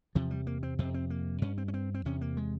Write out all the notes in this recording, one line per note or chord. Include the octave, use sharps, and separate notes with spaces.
E2 C3 F3
G3
A#3
C4
F2 C3 C4
C4
A#3
G2 C#4
C4
C#4
C4
C4
E2 C3 C#4
A#3
G#3